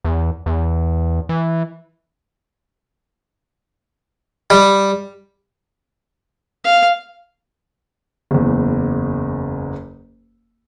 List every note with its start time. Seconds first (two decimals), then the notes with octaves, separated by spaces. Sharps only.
0.04 E2
0.46 E2
1.29 E3
4.50 G3
6.64 F5
8.31 F#1 E2